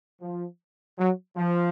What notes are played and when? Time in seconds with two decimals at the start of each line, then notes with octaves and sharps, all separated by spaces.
0.21 F3
0.98 F#3
1.36 F3